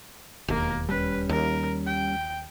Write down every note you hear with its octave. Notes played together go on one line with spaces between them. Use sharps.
E1 D#2 A#3 A#4
G3 C#4 B4
D#2 A#4
G5